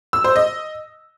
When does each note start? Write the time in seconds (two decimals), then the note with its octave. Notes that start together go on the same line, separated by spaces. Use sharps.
0.13 E6
0.24 C5
0.36 D#5